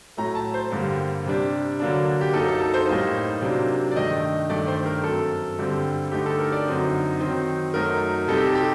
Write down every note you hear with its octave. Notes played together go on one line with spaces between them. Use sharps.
A2 F#3 A3 A#5
A5
C5
G2 D3 G3 A#3
C3 G3 D4
D3 F#3 A#3 D4
G4
F#2 F#3 A#3 D#4 A4
A4
A4
C5
A2 G3 A#3 D#4
C3 F#3 A#3 D4
D5
G2 D#3 A3 D4 D#5
G2 D#3 A3 D4 D5
C5
A#4
F#2 F#3 C4 A4
G2 D3 G3 C4
D3 A3 D#4 G4
A4
A#4
D5
F#2 D3 F#3 C4 D#4
D#3 F#3 C4 D#4
F#2 F#3 A3 D#4 A#4
C3 G3 C4 D#4 A4
G4
A4
G4